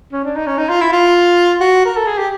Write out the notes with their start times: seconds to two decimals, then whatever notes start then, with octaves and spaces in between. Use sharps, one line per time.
0.12 C#4
0.24 D4
0.35 D#4
0.47 C#4
0.58 D#4
0.69 F4
0.81 E4
0.92 F4
1.60 F#4
1.85 A#4
1.96 A4
2.07 G#4
2.18 G4